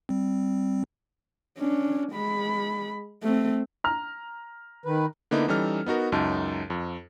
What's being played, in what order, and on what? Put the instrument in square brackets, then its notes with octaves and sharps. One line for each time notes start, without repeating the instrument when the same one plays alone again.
[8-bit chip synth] G3 C4
[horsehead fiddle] C#4 D4
G#3 B5
A3 C4
[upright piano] A#5 F6
[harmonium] D#3 B4
[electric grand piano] D3 A#3 B3 D#4 E4
E3 G3 C#4 D#4 A4 F6
B3 D#4 F#4 A#4
C#2 F#2 D#4 A5
F2